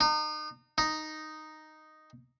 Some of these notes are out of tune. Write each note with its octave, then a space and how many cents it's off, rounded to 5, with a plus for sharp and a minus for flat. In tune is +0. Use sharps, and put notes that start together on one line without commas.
D#4 -35
D#4 -5